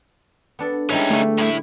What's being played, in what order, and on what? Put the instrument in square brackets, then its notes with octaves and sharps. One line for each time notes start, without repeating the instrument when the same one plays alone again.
[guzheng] B3 D4 A4
[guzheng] G3 G#3 E4 [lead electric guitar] C#4 D#4
[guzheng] D3 [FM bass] A3
[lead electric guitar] A2 E4